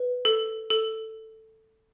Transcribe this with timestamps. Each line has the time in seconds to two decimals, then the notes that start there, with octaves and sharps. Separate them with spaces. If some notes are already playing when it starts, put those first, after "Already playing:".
Already playing: B4
0.25 A4
0.70 A4